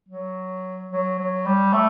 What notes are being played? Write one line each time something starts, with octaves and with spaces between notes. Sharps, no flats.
F#3
F#3
F#3
G3
A3